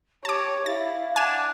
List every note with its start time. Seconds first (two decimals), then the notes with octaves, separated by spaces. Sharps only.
0.25 G4 C#5 A5 D6
0.66 E4 F5 A6
1.16 D4 F#5 G#5 E7